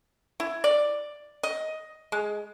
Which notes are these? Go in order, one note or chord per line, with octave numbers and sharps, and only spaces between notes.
E4
D5
D#5
G#3